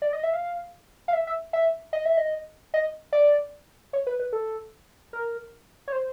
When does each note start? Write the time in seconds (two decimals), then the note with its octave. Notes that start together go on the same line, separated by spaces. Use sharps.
0.02 D5
0.13 D#5
0.23 E5
0.33 F5
1.08 F5
1.13 E5
1.27 E5
1.53 E5
1.93 D#5
2.05 E5
2.17 D#5
2.74 D#5
3.13 D5
3.93 C#5
4.07 B4
4.20 B4
4.33 A4
5.13 A#4
5.88 C#5
5.93 C5